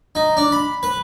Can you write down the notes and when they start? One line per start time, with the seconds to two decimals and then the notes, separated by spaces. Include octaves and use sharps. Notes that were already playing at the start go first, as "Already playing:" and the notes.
0.15 D#4
0.37 D4
0.52 B5
0.83 B4